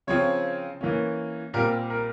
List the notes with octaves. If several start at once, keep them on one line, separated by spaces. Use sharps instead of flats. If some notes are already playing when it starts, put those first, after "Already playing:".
C#3 F3 C4 C#5
E3 A#3 C#4
A#2 G3 C4 A#4
A#4